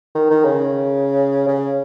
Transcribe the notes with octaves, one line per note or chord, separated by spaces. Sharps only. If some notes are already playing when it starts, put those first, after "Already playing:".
D#3
D#3
C#3
C#3